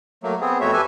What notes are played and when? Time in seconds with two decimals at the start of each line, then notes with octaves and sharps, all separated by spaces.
0.23 F#3 A3 A#3
0.41 B3 C4 G#4
0.61 F2 A3 B3 F#4 C#5 E5
0.73 G4 A4 B4 E5 G#5